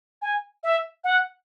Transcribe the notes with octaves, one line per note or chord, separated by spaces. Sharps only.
G#5
E5
F#5